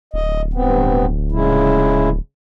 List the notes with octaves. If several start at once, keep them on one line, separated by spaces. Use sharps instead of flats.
D1 D#5
G2 B3 C4
C#3 G#3 E4